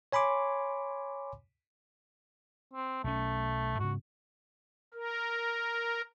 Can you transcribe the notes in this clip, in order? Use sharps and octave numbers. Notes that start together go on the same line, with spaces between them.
C#5 G#5 B5 C6 D6
C4
B1 D#3 A3 C#4
G#2 C#3 F#4
A#4